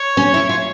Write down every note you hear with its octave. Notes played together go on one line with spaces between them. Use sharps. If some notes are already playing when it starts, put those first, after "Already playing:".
Already playing: C#5
C#4
E4
F4 C#5